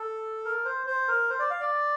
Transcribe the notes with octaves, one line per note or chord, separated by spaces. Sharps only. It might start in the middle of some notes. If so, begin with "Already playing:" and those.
Already playing: A4
A#4
C5
C5
A#4
C5
D5
F5
D5